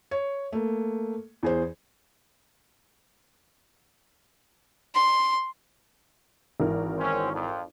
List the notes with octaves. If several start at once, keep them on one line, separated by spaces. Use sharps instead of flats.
C#5
A3 A#3
E2 G#4 C5
C6
G#1 E3 A#4
C4 C#4
F2